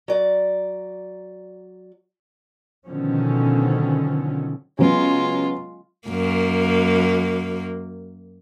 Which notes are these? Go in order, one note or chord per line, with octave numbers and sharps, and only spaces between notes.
F#3 D5 A#5
B2 D3 D#3 F3 F#3 C#4
C#3 F#3 G#3 B3 F4
F#2 A#3